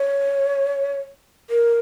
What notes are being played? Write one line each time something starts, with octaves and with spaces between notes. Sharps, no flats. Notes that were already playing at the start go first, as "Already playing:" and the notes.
Already playing: C#5
A#4